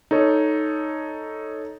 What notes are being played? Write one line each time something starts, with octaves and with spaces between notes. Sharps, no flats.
D#4 A4 C#5